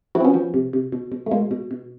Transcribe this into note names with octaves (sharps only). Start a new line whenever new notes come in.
F3 E4 F#4
C4
B3 C#4
F3
C3
C3
B2
B2
A3
B2 G#3 A#3
B2
B2